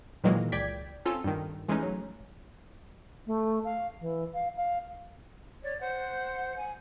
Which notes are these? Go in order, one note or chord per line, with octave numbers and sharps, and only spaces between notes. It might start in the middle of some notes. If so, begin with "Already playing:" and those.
A#2 D#3 E3 F#3 G#3 A#3
C#2 D5 G5 G#6 B6
C4 C#4 F4 A4
G2 D#3
E3 G#3 A3 C#4 D#4
F#3
A3
F5
E3
F5
F5
C#5 D5
C5 F#5
G#5